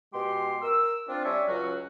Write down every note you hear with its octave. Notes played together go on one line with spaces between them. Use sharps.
B2 G#3 G4 C6
A#4 E6
C4 D4 F4
G3 C#4 D4 C#5 E5
C#2 F#3 C#4 F#4